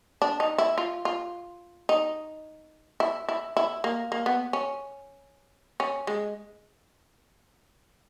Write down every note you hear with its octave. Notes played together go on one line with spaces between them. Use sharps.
D4
D#4
E4
F4
F4
D#4
E4
E4
E4
A#3
A#3
B3
C#4
C#4
G#3